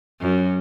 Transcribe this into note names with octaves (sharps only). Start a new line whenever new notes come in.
F#2